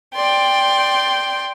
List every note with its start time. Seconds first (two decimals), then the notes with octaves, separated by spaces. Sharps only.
0.15 D5 G5 C6